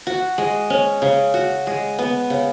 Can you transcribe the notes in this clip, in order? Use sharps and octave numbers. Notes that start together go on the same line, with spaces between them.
F#4
G#3
C#4
C#3
F#4
G#3
B3
C#3